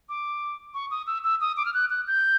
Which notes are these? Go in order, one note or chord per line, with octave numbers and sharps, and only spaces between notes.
D6
C#6
D#6
E6
E6
D#6
D6
F6
F#6
F#6
G6